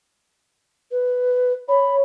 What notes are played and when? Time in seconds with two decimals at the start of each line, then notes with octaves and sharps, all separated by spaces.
0.91 B4
1.69 C#5 B5